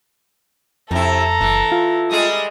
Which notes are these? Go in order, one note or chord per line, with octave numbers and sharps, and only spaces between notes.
F2 C3 E4 A4 A#5
F#1 E3
F4
G3 G#3 G#4 D#6